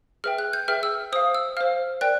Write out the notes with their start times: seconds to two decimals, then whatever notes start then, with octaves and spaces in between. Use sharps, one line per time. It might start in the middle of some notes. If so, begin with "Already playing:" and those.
0.24 G#4 B4 E5 G5 F6
0.38 F#6
0.53 G6
0.68 G#4 B4 E5 G5 F6
0.83 E6
1.12 C5 F5 D#6
1.35 E6
1.57 C5 F5 F6
2.01 A#4 D5 G5 F#6